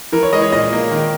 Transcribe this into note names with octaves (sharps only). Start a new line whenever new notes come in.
E3 A#4
C#5
G#3 D#5
C#5
A#2 D#5
A#3
D#3